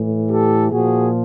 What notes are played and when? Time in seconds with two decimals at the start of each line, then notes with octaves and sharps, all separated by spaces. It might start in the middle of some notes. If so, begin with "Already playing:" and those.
Already playing: A2 E3
0.30 G4 A4
0.71 A#2 F3 F#4 G#4